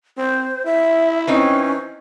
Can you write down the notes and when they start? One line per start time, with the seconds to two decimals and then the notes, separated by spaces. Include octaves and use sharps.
0.18 C4 C5
0.66 E4 E5
1.27 E3 C4 C#4 D#4